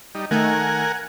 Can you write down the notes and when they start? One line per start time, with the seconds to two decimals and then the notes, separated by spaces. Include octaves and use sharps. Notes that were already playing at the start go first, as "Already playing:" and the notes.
0.15 G3 D#4
0.31 D#3 A3 D#4 A#4 F#5 G#5